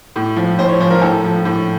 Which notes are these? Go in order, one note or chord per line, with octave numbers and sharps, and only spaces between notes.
A2
F3
A2 C5
C#5
F3 C5
A#4
A2 A4
F3
A2